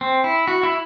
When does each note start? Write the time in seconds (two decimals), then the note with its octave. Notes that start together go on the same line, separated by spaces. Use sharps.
0.01 C4
0.24 E4
0.48 F#4
0.63 E4